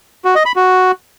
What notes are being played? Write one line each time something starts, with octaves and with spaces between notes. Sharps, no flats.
F#4
D#5
B5
F#4